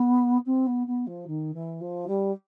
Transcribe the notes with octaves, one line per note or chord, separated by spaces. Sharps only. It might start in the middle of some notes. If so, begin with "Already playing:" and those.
Already playing: B3
C4
B3
B3
F3
D#3
E3
F3
G3